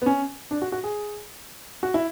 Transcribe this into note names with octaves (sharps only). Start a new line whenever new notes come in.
B3
C#4
D4
F#4
F#4
G#4
F#4
E4